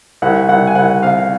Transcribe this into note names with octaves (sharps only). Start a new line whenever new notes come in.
C2 F#5
C2 F#5
G#5
C2 F#5
C3 F5